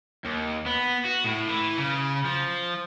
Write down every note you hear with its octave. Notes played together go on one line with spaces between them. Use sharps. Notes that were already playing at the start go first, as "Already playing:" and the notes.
D#2
B3
F#4
A2
E3
C#3
F3